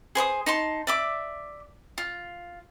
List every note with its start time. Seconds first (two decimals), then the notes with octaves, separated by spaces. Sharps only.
0.15 G#4 C5 C6 D#6
0.46 D#4 A5 C6
0.87 D5 E5 D6
1.98 F4